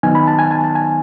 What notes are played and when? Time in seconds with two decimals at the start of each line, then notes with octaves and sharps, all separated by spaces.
0.03 D#3 F#3 B3 D#4 G#5
0.15 B5
0.28 A5
0.39 G#5
0.51 A5
0.64 A5
0.75 G#5